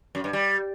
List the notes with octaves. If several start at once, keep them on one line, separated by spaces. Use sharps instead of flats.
F#2
G2
G3